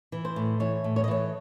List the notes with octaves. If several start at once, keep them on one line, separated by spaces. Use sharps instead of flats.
E3
C5
A2
E3 C#5
A2
C#5
D#5
E3 C#5